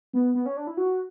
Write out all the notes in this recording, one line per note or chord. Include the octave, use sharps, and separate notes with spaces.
B3
B3
C#4
D4
E4
F#4